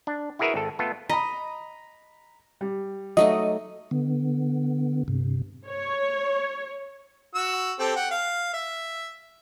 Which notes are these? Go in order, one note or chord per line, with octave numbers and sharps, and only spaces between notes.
D4
E4 F#4 G#4 A#4 B4 E5
G#1 A4
A3 B3 F4 A4
D#5 A#5 B5
G3
F#3 A3 D#4 D#5
D3 B3
G2 C3
C#5
F#4 E6
C4 G4 A4
F#5 G5
F5
E5